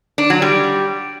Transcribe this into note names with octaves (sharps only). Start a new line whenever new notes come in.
D4
F#3
G3